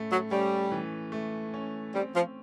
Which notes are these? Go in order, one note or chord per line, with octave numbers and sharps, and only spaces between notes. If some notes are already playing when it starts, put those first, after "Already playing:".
Already playing: A2 A3 C#4
F#3
G3 C#4
E3
A3
C#4
G3 C4
F3